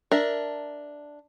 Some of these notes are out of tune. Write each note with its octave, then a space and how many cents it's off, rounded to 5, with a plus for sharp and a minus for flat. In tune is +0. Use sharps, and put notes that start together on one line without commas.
D4 +0 A#4 +0 E5 +0